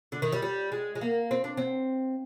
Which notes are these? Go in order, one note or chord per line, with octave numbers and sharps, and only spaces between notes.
D3
D#3
G3
G3
G#3
G#3
A#3
C4
D4
C4